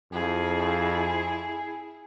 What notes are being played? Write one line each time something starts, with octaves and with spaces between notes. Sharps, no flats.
F2 E4 G#4